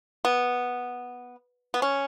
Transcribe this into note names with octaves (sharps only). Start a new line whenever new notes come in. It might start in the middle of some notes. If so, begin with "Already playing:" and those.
B3
B3
C#4